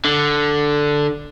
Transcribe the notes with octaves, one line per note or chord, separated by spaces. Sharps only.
D3